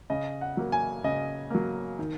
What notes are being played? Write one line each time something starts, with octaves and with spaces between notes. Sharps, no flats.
C#3 D#5
F#5
F#3 A#3
G#5
C#3 D#5
F#3 A#3
D#3